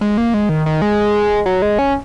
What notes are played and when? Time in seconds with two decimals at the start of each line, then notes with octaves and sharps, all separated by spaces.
0.01 G#3
0.18 A#3
0.34 G#3
0.49 D#3
0.66 D#3
0.82 G#3
1.46 F#3
1.62 G#3
1.79 C#4